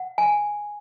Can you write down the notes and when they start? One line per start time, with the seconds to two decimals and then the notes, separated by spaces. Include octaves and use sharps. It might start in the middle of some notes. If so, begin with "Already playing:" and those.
Already playing: F#5
0.18 G#5